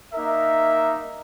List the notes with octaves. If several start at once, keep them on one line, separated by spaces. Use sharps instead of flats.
A#3 D#4 A#4 E5